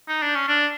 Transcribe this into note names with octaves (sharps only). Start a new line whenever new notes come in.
D#4
D4
C#4
D4